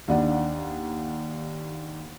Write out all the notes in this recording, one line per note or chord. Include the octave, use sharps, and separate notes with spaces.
D#2 D4 F#5